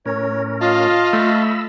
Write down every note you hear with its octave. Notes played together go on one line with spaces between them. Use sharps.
A2 C#4 A#4 C#5
F4 D#5 F5 A5
A3 B5 E6